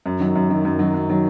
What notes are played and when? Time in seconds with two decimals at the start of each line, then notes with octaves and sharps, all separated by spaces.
0.06 F#2
0.20 D#3 F#3
0.35 F#2
0.50 D#3 F#3
0.65 F#2
0.79 D#3 F#3
0.94 F#2
1.09 D#3 F#3